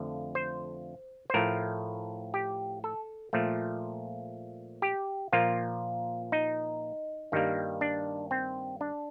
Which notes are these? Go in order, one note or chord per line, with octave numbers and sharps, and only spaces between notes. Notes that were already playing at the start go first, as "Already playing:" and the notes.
Already playing: F2 D3 F3 A3
C5
C5
A2 F3 A3 A#4
G4
A4
A#2 F3 A3
G4
A#2 F3 A#3 F4
D#4
G2 D#3 G3 A#3
D4
C4
D4